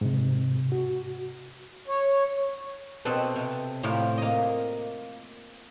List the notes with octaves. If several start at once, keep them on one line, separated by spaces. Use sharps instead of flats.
G#2 C3
F#4
C#5
B2 C4 A4 B4
C3
A2 C3 E4 F4 G4
A#3 D#5